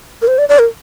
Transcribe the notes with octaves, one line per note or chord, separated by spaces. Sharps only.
A#4
C5
D5
D5
A#4